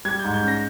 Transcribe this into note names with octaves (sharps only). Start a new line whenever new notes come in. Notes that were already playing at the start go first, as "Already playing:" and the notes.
G3 G#6
G#2 G6
G6
C#4
A#6